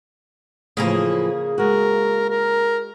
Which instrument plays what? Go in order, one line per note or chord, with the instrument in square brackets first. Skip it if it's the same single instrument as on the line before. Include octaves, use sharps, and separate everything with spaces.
[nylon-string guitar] A2 E3 F3 [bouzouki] C#3 A#3 G#4
[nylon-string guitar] G#3 F#4 [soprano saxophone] A#4
[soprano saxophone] A#4